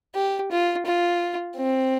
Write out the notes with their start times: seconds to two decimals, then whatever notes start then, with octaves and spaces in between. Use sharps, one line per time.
0.15 G4
0.51 F4
0.86 F4
1.57 C4